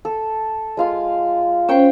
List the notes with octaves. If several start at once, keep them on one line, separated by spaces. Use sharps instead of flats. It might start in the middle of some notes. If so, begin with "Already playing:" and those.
A4
G#3 F4 F5
C#4 C5 C#5 G5 C#6